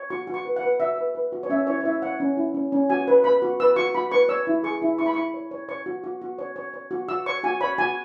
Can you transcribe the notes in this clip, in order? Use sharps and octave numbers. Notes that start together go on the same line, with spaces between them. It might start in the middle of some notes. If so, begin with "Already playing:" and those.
Already playing: C#5
F#4 C#6
F#4
C#6
B4
F#5
B4
F#4 E5
B4
B4
F#4
C#5
C#4 E5
E4 C#5
C#5
E4 E5
C#5 F#5
C#4
E4
C#4
C#4
F#4 G#5
B4
B4 B5
F#4
B4 E6
F#4 C#6
F#4 B5
B4 C#6
C#5 E6
E4
G#4 C#6
E4
E4 C#6
B5
E4 C#6
C#5
C#5
C#5 C#6
F#4
F#4
F#4
C#5
C#5
C#5
F#4
F#4 E6
C#5 C#6
F#4 G#5
C#5 B5
F#4 G#5